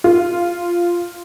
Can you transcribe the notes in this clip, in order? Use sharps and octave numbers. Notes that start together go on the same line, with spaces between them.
F4